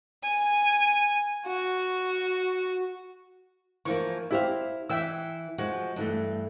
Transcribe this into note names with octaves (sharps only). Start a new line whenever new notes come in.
G#5
F#4
E3 F3 A#3 C#6
E4 G4 C5 E5 F5
E3 E5 G5 E6
F3 G#3 F#4
G2 E3 A3